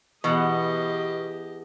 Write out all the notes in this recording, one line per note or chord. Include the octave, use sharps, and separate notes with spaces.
E2 B2 B3 G4 D#5 F#5